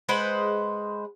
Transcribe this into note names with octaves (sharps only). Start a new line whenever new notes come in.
G#3 B4 C5 F#5